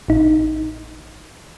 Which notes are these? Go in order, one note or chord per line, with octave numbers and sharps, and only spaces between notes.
A1 D#4